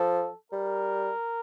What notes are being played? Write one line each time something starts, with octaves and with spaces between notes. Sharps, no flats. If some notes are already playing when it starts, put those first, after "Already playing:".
Already playing: F3 A4
G3 A#4